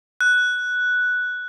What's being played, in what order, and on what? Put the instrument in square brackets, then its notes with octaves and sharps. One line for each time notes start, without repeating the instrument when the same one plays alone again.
[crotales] F#6